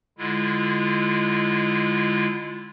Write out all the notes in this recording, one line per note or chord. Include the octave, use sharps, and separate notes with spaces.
D3 G#3 E4 F4